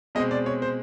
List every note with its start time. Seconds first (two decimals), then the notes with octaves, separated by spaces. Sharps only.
0.15 B2 G#3 C4 D#5
0.31 D5
0.46 C#5
0.62 C5